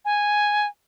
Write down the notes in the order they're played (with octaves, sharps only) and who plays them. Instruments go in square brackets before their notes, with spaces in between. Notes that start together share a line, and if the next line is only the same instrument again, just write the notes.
[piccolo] G#5